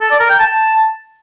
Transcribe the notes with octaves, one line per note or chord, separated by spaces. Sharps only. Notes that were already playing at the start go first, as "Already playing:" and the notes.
A4
D5
A#4
G5
A5